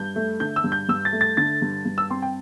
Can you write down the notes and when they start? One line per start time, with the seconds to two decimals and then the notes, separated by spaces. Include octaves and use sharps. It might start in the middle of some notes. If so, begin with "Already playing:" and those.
Already playing: G2 G6
0.16 A3
0.40 D3 G6
0.56 E6
0.64 G2
0.72 G6
0.89 G2 E6
1.05 A6
1.13 A3
1.21 A6
1.37 D3 A6
1.62 G2
1.85 G2
1.98 E6
2.10 C4 C6
2.22 G5